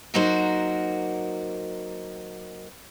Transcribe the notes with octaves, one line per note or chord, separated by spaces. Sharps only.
F#3 A#3 D#4 F#4 A#4 C5